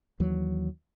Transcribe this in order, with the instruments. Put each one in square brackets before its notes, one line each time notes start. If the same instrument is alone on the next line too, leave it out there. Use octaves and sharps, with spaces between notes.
[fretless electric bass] D#2 E3 F#3